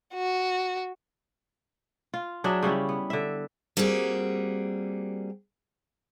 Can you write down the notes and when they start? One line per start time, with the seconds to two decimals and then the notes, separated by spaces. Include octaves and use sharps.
0.14 F#4
2.14 F4
2.44 F#3 D4 G#4 E5
2.63 C#3 G3 C#4 E4
2.89 B3
3.10 D3 E5
3.77 G3 A#3 C4 F#4 G#4